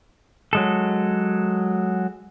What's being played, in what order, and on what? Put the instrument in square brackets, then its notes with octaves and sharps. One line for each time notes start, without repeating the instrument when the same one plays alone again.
[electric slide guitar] F#3 G#3 A4